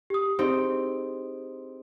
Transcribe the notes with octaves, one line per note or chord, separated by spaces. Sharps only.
G4 D#6
C4 D#4 G4 G#4